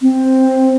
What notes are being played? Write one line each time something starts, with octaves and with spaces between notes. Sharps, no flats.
C4